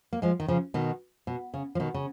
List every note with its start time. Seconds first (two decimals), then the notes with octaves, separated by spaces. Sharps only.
0.13 A#3
0.22 F3 G#3
0.40 D#3
0.48 C#3 F3
0.74 B2 D#3
1.27 B2
1.54 C#3
1.75 F3
1.80 B2 D#3
1.94 C#3